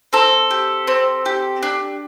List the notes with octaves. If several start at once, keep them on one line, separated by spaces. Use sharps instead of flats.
C4 A4
G4
C4
G4
D4